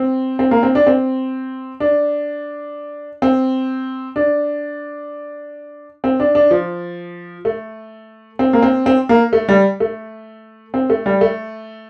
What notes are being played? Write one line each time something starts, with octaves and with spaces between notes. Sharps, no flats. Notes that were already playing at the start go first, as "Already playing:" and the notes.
Already playing: C4
C4
A#3
C4
D4
C4
D4
C4
D4
C4
D4
D4
F3
A3
C4
A#3
C4
C4
A#3
A3
G3
A3
C4
A3
G3
A3